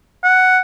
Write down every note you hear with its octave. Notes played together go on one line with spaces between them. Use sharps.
F#5